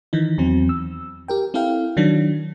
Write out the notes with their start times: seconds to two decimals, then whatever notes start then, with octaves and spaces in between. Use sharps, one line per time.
0.13 D#3 E3 D#4
0.38 E2 F#3 C4
0.69 E6
1.28 G4 A#4 G5
1.54 C4 E4 A4 F5 G5
1.97 D#3 F#3 D4